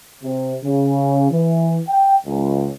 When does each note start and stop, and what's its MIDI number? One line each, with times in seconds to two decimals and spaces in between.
0.23 0.56 48
0.64 1.31 49
1.32 1.79 52
1.89 2.17 79
2.27 2.71 37